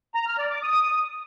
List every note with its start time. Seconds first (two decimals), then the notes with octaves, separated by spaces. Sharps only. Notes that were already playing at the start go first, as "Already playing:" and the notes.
0.15 A#5
0.27 F6
0.39 D5
0.51 D6
0.63 D#6